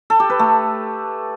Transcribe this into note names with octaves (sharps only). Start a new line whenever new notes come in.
A4
G4
B4
A3